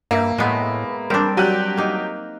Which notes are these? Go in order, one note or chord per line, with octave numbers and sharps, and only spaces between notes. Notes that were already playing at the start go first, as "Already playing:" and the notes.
G2 A#3 E5
A2 G#3 B3
G3 C4 D4 A#4
F#3 F#4 G4 F#6 D#7
A#3 D#4